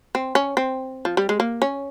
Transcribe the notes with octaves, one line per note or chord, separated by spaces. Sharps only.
C4
C#4
C4
F3
G3
G#3
A#3
C#4